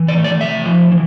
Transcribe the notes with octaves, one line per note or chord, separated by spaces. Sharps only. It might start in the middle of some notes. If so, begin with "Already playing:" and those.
Already playing: E3
D5
A3
D5
C3 E5
F3
E3